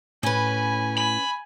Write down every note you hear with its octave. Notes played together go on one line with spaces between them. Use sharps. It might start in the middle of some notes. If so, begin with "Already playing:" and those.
A2 C#4 B4 G#5 B5
G#5 B5